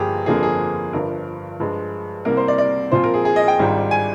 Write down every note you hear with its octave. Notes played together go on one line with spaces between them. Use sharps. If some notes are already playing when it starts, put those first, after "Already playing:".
Already playing: G1 G2 F3 A#3 G4 G#4
G1 F2 D3 F3 A#3 G#4
G#4
G1 G2 F3 A#4
G2 F3 G#3
C2 C3 G3 A#3 A#4
C5
D5
D5
A#2 F3 C4 F4 C5
A#4
G#4
G#4
D#5
G5
G#1 G#2 G3 D4 F4
G#5